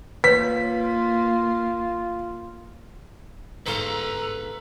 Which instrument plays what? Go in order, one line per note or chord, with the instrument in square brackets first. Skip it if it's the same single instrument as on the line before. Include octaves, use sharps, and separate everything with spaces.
[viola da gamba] A#3 [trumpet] F4 [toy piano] B4 C#5 [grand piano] B6
[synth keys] G1 G#2 F5 [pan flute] A4 [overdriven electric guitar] B4 C6 [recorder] A#5